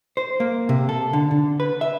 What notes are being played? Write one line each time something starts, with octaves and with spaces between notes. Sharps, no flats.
C5
A#3
C3
A4
D3
D3
B4
E5